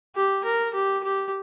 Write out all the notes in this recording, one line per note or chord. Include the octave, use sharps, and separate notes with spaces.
G4
A#4
G4
G4